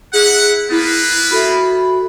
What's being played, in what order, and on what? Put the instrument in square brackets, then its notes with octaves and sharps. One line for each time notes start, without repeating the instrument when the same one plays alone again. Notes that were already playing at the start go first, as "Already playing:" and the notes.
[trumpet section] E4 F#5 [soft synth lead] G#4
[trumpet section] A#3 B3 B4 [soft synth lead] E4
[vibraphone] F#4 A4 E5 [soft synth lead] B5